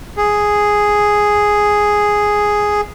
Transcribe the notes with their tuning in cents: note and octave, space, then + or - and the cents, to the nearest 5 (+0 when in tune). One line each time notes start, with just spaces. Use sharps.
G#4 +0